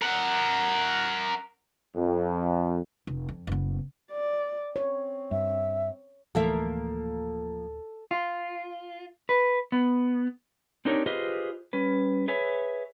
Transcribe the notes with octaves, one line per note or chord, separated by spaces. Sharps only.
A#4 F#5
F2
F1
F2
F#1 B3
D5
C4 C#5
G2 E5
D1 E3 F3 A3 A#3 A4 E5
F4
B4
B3
C4 D4 D#4 G4 A#4 C#5
F4 G4 G#4 B4 C5 D#5
G3 C#4 B4
G#4 B4 C#5 E5 G#5